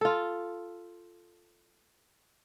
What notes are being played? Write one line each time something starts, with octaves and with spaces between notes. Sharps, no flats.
F4 A4